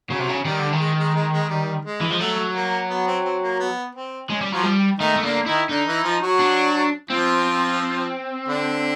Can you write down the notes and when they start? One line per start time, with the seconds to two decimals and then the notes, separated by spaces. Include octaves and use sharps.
0.10 C#3 F#3
0.19 C3
0.29 C#3
0.45 D#3 G3
0.59 D3
0.73 D#3
0.80 G#3
0.98 G#3
1.15 G#3
1.32 G#3
1.50 G3
1.85 G#3
2.01 E3
2.09 F3 G#3
2.19 F#3 A3
2.55 A#3
2.90 B3
3.07 C4
3.25 C4
3.42 A#3
3.59 B3
3.95 C4
4.29 G#3 C#4
4.41 G3
4.52 F3 F#3 F4
4.63 G3
4.99 D#3 A3 D#4
5.16 A3
5.23 D3 A#3 D4
5.46 D#3 D#4 E4
5.69 D3 D4 D#4
5.87 E3 E4
6.04 F3 F4
6.22 F#3 F#4
6.39 D4
7.10 F3 C4 F4
8.49 D3 D4